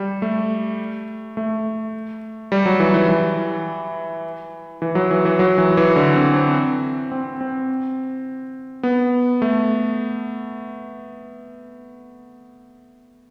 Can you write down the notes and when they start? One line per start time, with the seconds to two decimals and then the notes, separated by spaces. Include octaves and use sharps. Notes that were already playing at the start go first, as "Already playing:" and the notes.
Already playing: G3
0.22 A3
1.37 A3
2.52 G3
2.66 F#3
2.80 E3
2.94 E3
3.08 E3
4.82 E3
4.95 F#3
5.11 E3
5.25 E3
5.39 F#3
5.58 E3
5.77 E3
5.96 D3
6.16 C4
6.35 C4
7.12 C4
7.41 C4
8.83 B3
9.42 A3